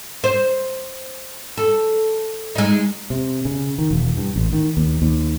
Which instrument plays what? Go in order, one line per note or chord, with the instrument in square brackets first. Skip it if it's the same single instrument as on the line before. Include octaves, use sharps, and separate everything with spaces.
[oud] C5
A4
G#3 D#4
[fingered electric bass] C3
C#3
D#3
E1
G2
A1
D#3
D#2
D#2